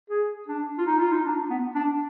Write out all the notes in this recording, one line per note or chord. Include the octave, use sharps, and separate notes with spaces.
G#4
D4
F4
D#4
F4
D#4
D4
B3
D4